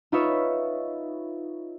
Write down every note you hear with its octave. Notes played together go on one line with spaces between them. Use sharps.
D#4 F4 B4 C#5 D#5 E5